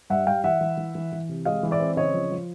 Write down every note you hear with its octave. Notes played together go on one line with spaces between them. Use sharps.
G2 E5 F#5
G3 F5 G5
E3 E5 F#5
E3
E3
E3
E3
C3
G#3 D#5 F5
E3
D5 E5
C4
C#3 C#5 D#5
F3
F3